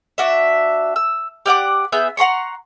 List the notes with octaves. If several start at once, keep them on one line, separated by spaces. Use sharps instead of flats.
D4 F#4 E5
E6
G4 D5 F#5 D6
B3 G#4 E5 G6
F#5 A#5 C6 C#6